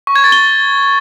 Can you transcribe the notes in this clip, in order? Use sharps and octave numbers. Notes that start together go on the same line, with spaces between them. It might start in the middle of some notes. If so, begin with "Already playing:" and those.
C#6
G#6
A6
G7